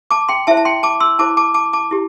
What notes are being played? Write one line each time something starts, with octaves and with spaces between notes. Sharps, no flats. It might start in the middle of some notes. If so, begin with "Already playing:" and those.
A5 D6
G5 C6
E4 C5 E5 A5
A5
G5 C6
A5 D6
C6 E6
E4 C5 A5 D6
A5 D6
A5 D6
A5 D6
E4 G4